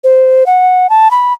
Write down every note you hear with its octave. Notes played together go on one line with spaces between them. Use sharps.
C5
F#5
A5
B5